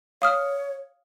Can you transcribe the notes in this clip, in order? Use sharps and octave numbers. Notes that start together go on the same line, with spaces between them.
C#5 F5 D#6 F6